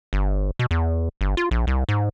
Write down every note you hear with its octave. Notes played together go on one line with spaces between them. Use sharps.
G1
B2
E2
G1
F4
A#1
C2
G#2